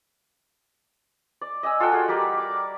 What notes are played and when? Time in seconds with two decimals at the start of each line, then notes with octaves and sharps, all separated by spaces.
1.41 D5
1.63 D#5 G#5 E6
1.80 F4 A4 F#5 G5
1.92 F#4 G#4
2.08 G3 G4 A#4 D5
2.38 D6